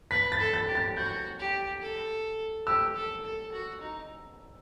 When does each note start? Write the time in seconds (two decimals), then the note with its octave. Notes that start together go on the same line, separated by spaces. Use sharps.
0.11 B4 B6
0.32 A6
0.40 A4
0.54 A6
0.68 G4
0.75 A6
0.96 F#4 G6
1.39 G4
1.82 A4
2.67 G4 E6
2.95 A4
3.24 A4
3.52 F#4
3.81 D#4